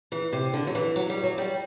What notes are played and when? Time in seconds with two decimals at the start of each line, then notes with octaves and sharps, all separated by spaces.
0.12 E3
0.32 C3
0.53 D3
0.67 F#3
0.75 E3
0.96 F#3
1.10 G3
1.23 F#3
1.38 G3